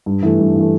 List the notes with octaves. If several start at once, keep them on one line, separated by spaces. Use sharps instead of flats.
G2
E3 A3
G2
E3 A3